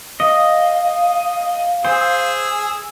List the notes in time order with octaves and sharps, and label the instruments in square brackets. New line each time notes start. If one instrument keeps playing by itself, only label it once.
[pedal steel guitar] D#5 [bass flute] F5
[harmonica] G#4 E6 [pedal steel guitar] C5